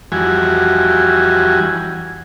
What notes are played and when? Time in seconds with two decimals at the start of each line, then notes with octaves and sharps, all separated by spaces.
0.12 F2 E3 G3 F#4 G#5